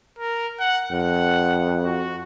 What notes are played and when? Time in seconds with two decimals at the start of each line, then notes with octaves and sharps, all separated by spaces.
0.19 A#4
0.60 F#5
0.92 F2 F#5
1.84 F#4